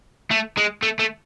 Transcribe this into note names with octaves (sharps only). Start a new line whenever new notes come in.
A3
G#3
A3
A3